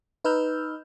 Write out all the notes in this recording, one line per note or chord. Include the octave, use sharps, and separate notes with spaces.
D#4 B4 D#5 E6 F6 G6